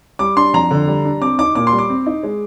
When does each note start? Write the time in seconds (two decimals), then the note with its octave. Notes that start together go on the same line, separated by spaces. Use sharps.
0.19 G3 D6
0.37 D4 C6
0.54 F2 A#5
0.71 D3
0.88 G3
1.05 D4
1.21 C4 D6
1.39 D#4 D6
1.55 A#2 D6
1.67 C6
1.72 G3
1.78 D6
1.90 C4
2.06 D#4
2.23 G#3